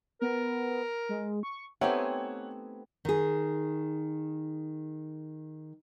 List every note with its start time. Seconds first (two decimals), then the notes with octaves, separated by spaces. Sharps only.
0.22 B3 A#4
1.09 G#3
1.43 C#6
1.81 A3 B3 C4 D#4 G4 C#5 F#5 G#5
3.05 D#3 G#4